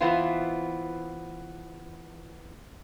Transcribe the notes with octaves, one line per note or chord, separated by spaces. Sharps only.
E3 B3 C4 E4 F4